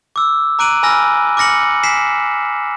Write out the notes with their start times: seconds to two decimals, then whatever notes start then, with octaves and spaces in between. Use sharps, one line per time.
0.16 D6 E6
0.59 A#5 D6 F#6 D7 D#7 F#7
0.83 G#5 B5 E6 F6 A#6
1.37 D6 F6 A#6 C#7 F#7
1.83 G#5 B6 C7 E7